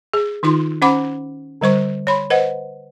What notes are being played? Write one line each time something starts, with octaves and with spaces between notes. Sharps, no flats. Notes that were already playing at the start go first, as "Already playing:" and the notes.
G#4
D#3 D#4 F4 C6
C#4 C5 F#5 B5 D6
D3 G3 C5 C#6
C#5 B5 C6
B4 C5 D#5 F#5